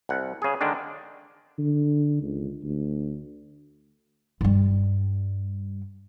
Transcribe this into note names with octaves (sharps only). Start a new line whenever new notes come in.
C2 F#5
C#3 G#4
D3 D#3 G#3 D4
D3
C#2
D2
G2 G3